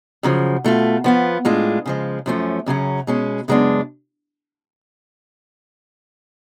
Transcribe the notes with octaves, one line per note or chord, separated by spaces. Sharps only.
F#2 C#3 F3
B2 A3 F4
F3 B3 F4
A2 G#3 D4 F4
C#3 F3 G#3
F#2 F3 A3 C#4
F#2 C#3 F#3 C#4
B2 G#3 C#4
F#2 C#3 G#3 B3 D4